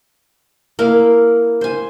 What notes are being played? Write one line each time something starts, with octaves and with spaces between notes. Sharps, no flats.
A#3 E4 F5
C5 G#5